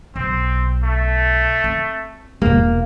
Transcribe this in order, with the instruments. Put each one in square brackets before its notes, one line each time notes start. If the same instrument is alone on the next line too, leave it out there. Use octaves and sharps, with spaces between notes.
[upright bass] B1 [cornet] C4
[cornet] A3
[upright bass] C4
[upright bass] E1 C3 [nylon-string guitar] A#3